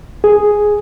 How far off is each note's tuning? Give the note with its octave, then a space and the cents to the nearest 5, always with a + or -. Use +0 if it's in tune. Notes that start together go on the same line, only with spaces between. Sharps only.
G#4 +0